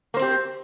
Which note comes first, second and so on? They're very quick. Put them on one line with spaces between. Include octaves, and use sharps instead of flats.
A#3 C5 C4 G4